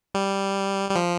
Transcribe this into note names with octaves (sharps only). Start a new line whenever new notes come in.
G3
G3
F3